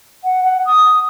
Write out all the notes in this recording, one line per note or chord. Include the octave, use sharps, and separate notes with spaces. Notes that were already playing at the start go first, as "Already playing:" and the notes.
F#5
F#5
D#6